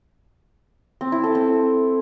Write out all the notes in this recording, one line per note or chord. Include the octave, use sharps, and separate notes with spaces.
C4
E4
A4
C4